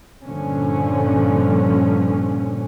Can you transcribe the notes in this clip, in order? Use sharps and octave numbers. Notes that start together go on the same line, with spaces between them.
G2 A#2 D3 F3 C#4